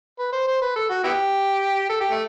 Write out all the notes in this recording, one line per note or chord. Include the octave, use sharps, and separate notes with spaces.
B4
C5
C5
B4
A4
F#4
B3 E4 G4
A4
G4
A3